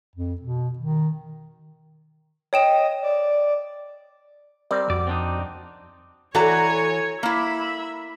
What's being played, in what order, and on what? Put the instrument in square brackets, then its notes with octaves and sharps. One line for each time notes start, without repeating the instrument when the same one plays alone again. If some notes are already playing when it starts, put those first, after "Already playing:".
[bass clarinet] F2
B2
D#3
[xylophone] C#5 G5 E7 [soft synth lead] D#5
[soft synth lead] D5
[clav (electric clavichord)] G3 C4 A#4 [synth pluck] D5
[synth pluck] F2 [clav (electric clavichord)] F#4 F#5 [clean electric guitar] D5
[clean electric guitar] C4 D4 D#4
[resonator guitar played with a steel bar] E3 F#4 A#5 [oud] A4 D5 [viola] C#5 G#5
[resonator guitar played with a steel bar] A#3 E4 [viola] E5 B5